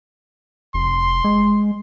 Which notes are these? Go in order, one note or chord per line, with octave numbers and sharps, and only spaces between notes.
F1 C6
G#3